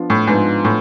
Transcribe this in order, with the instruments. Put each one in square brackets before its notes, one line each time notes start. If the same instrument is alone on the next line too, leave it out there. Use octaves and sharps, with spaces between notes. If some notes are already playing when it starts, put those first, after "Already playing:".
Already playing: [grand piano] F3 B3 D4 F4
[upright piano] A2
[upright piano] G#2 [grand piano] F3 B3 D4 F4
[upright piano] A2